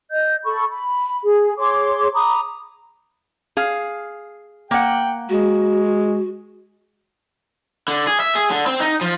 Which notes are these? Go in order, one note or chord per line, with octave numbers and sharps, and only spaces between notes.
D#5 G6
A4 B5 C#6
B5
G#4
G#4 C#5 C6 D6
A#5 B5 D6 D#6
G#4 F5
A#3 F#5 G5
G#3 F#4
D3
G#4
E5
G#4
D3
C4
D#4
F3